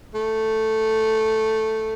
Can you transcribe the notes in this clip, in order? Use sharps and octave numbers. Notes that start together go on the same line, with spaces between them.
A3